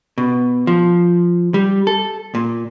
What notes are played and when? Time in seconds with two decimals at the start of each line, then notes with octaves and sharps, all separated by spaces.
0.18 B2
0.67 F3
1.54 G3
1.87 A4
2.35 A#2